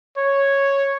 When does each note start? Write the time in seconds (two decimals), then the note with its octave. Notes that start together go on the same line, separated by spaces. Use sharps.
0.17 C#5